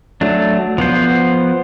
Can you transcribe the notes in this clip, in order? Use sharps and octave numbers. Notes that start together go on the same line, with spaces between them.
F#3 A3 D4
F3 B3 C5